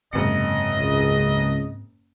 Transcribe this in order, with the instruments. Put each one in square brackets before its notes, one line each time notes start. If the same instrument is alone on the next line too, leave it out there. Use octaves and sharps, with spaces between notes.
[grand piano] F#1 C#7 [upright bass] G#2 C3 [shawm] D#5
[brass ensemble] C#2